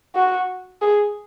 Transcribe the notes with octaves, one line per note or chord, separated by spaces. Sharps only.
F#4
G#4